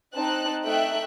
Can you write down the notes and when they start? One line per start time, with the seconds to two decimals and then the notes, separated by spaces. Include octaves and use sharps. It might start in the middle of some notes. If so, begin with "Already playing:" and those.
0.14 C4 D#4 A5 F#6
0.63 A3 D#4 E5 G5 F#6